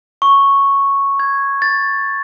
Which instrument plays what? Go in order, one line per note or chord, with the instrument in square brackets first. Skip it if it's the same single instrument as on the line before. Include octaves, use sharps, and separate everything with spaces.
[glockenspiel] C#6
G#6
A6